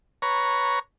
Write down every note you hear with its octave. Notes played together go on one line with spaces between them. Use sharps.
B4 C#5 A#5 C#6